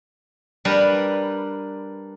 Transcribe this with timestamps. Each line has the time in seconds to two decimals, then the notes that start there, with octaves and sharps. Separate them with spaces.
0.65 G3 D4 A#4 B4